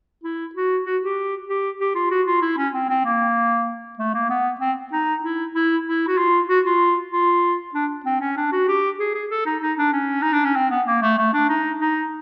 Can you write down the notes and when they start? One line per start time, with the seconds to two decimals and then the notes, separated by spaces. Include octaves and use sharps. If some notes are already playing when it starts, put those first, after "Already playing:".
0.24 E4
0.55 F#4
0.86 F#4
1.02 G4
1.48 G4
1.80 G4
1.95 F4
2.11 F#4
2.26 F4
2.42 E4
2.58 C#4
2.74 C4
2.89 C4
3.05 A#3
3.99 A3
4.14 A#3
4.30 B3
4.61 C4
4.93 D#4
5.23 E4
5.55 E4
5.86 E4
6.08 F#4
6.17 F4
6.49 F#4
6.65 F4
7.11 F4
7.74 D4
8.05 C4
8.21 C#4
8.37 D4
8.52 F#4
8.68 G4
8.99 G#4
9.14 G#4
9.31 A4
9.46 D#4
9.62 D#4
9.78 D4
9.93 C#4
10.22 D#4
10.33 D4
10.44 C#4
10.55 C4
10.71 B3
10.87 A#3
11.02 A3
11.18 A3
11.34 D4
11.49 D#4
11.81 D#4